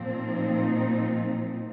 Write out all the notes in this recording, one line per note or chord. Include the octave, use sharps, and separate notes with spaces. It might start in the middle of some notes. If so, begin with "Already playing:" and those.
Already playing: A#2 F3 C4
D#4